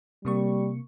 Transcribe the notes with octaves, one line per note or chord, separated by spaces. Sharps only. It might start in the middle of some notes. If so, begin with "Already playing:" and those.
C3 G3 A#3 C#6